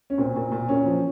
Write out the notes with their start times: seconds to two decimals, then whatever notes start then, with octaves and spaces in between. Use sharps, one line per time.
0.10 C#4
0.18 A#2 C4
0.36 A#2
0.52 A#2
0.69 A#2 C#4
0.86 F3